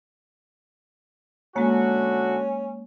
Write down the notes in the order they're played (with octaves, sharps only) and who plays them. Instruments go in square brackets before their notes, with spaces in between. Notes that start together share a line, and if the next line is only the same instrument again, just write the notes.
[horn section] D3 F#4 [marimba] G#3 A#3 [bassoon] C#4